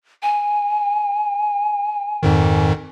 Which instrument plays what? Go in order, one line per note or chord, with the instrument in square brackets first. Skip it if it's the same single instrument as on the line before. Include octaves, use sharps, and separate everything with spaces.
[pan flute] G#5
[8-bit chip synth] F2 G#2 D#3